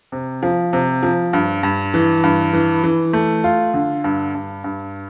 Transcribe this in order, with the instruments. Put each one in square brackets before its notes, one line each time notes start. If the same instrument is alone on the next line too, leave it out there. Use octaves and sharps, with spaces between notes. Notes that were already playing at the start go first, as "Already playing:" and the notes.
[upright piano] C3
F3
C3
F3
G2
G2
E3
G2
E3
E3
A3
F4
D3
G2
G2
G2